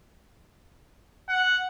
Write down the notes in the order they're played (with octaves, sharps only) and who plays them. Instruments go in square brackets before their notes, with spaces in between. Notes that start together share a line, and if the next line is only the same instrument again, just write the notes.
[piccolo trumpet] F#5